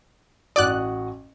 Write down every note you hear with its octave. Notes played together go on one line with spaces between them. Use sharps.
A1 F#4 D5 D#6 F#6